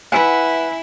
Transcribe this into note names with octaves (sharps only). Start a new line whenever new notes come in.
E4 B4 E5 F#5 G#5